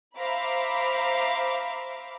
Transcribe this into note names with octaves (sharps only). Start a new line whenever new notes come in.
C5 E5 F5 A#5 B5 D6